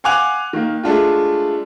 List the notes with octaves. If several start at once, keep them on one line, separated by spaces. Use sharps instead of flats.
F5 F#5 G#5 D6 F#6 F7
D#3 A#3
G#3 A3 D4 F4